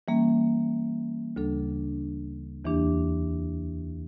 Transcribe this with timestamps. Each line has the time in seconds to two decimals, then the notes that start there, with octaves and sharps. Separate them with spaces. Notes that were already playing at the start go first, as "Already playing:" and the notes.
0.08 E3 G3 A#3 C#4
1.36 D2 C#3 G3 D4 A4
2.65 E2 E3 A#3 D4 G4